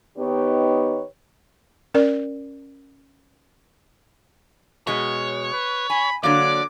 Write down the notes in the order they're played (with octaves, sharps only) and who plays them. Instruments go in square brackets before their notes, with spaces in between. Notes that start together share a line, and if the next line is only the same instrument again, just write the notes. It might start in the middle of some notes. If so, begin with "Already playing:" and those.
[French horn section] D#3 B3 D#4 G4 B4 C#5
[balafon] C#4 A#4 D5
[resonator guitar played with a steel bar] B2 G#3 [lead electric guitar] C#5
[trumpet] B4
[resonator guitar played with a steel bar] G#5 [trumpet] B5
[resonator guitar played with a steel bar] D3 F#3 A#3 [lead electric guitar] D5 [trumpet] D6